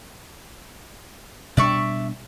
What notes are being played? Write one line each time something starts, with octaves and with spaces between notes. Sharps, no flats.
B2 G3 D4 D5 E5 C#6